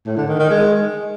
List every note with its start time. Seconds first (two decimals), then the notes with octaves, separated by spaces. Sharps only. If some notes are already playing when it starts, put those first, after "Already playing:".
0.06 A2
0.17 D3
0.28 D#3
0.39 D#3
0.50 G#3